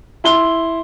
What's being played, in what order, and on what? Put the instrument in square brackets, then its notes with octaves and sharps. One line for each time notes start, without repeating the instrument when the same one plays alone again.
[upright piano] E4 C6 G7